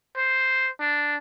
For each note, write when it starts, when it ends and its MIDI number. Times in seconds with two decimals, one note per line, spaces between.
0.17 0.70 72
0.80 1.16 62